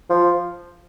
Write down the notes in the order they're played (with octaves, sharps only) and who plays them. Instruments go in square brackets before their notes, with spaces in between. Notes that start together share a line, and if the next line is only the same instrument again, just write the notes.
[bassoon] F3